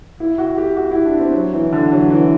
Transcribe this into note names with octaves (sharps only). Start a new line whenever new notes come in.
E4
F#4
G4
F#4
E4
D4
C4
F#3
E3
D3
F#3
E3